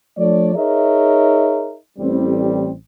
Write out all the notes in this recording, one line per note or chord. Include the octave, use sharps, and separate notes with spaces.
F3 A3 D4 C#5 D5
D#4 G#4 A#4 C#5 D#5 E5
A1 G3 C4